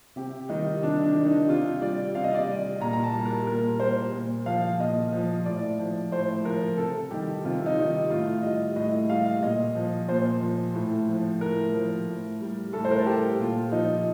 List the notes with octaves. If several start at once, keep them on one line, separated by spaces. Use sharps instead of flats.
C3 G4
D#3 G3 D#4
C3 D4
D4
D#3 G3
D#4
C3 F4
G3 D5
C3 F5
D#5
D5
G3 D#5
A#2 A#5
A#5
A5
G3
A#4
A#2 A#4
G3 C5
A#2
F3 F5
A#2 D#5
F3
A2 D5
F3
A2 C5
F3 A#4
C3 A4
D#3 G3 G4
C3 F4
D#4
D#3 G3
A2 F4
G3 D#5
A2 D#5
G3 F5
A#2 D#5
F3
A#2 C5
F3
A2
F3
A2 A#4
F3
A2
G3
A2 A4
C5
A#4
A4
G3 G4
A#2 F4
F3 D#4